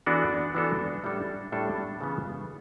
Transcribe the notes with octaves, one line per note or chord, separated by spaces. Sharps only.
E3 B3 D4 F#4 A4
E3 B3 D4 F#4 A4
A2 G3 D4 A4
A2 G3 D4 A4
C#3 E3 B3